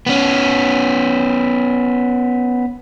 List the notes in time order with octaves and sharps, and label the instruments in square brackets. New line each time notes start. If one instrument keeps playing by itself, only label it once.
[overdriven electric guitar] B3 C#4